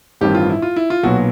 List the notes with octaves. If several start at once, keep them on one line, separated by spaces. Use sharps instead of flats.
A1 G2 D#3 G3 C4 G4
F4
E4
F4
E4
F4
B1 A#2 F#3 B3 F#4